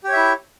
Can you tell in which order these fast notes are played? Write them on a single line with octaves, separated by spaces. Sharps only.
G4 C#5 E5 E4